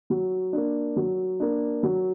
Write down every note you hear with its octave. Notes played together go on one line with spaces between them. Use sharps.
F#3
A#3 D4
F#3
A#3 D4
F#3